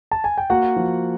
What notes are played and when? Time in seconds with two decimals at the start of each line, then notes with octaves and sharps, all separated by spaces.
0.11 A5
0.24 G#5
0.38 G5
0.50 A#3 F#4 F#5
0.76 F3